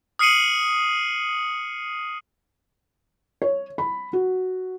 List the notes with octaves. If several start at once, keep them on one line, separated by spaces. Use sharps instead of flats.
D#6 F6 C7 C#7 D#7 F#7
C#5
B5
F#4